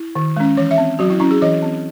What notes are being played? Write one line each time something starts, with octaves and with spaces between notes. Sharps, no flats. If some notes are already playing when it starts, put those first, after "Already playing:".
Already playing: E4
D#3
G#3 C#4
E3 C#5
E5
C4
F#3 F#4
E4
C#4 E4
G#4
E3 D#5
C4